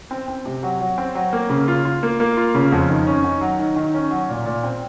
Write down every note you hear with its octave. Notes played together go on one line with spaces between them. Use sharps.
C4
C4
C3
F#3
F#3
C4
F#3
A#3
C#3
F4
F4
A#3
A#3
F4
C#3
F2
D#3
C#4
D#3
F#3
D#3
D#3
C#4
F#3
A#2
A#2
C4